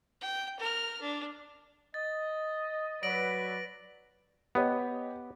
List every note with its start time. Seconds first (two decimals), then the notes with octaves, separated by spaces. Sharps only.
0.21 G5
0.60 A#4 F6
1.01 D4
1.94 D#5 A6
3.03 F#3 B4 D5 A#6 D7 F#7
4.55 B3 G4 C#5 D#5